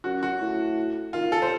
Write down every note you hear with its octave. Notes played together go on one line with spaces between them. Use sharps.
F#2 F#4
F#4
A2
D#3 F4
A4
C5